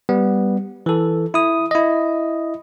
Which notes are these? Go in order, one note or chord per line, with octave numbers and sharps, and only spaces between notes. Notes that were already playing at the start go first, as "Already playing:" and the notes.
G3 B3
E3 A4
E4 D#6
E4 D#5